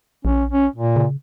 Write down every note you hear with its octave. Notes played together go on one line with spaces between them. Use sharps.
A#1 C#4
C#4
A#2
C#3